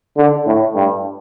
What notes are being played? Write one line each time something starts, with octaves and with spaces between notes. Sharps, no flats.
D3
A2
G2